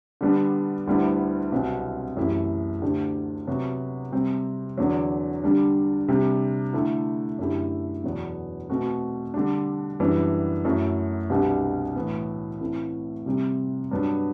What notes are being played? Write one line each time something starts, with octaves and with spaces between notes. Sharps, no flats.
D3 G3 B3 D4
D2 D3 G3 B3 E4
C2 B2 F#3 C4
F#2 E3 A3 E4 G4
D2 D3 A3 D4 G4
C3 F#3 B3 F#4
C3 G3 C4
E2 D3 F#3
D3 G3 D4
C3 G3 D4 G4
D3 A3 E4
F#2 D3 A3 E4 G4
E2 B2 F#3 B3
B2 A3 C4 F#4
D3 G3 D4
F#2 E3 G3 B3 D4
F#2 F#3 A3 E4
C2 B2 G3 D4 G4
A2 E3 B3
A2 E3 A3 C4 E4
C3 G3 C4
G2 F#3 B3 D4